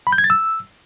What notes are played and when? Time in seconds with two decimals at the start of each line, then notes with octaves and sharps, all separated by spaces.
0.07 B5
0.12 G6
0.18 G#6
0.24 A6
0.30 E6